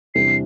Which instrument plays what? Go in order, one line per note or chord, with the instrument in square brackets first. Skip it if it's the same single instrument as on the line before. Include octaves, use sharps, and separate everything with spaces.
[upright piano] E2 C3 G3 D4 [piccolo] C7